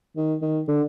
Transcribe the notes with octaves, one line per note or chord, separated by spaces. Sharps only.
D#3
D#3
D3